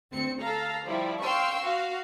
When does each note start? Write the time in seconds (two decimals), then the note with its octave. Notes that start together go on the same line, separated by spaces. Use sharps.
0.12 D2 C4 C#7
0.40 A4 F5 A#5
0.85 F3 G3 E4
1.22 F5 G5 C6 C#6 E6
1.64 F#4 F5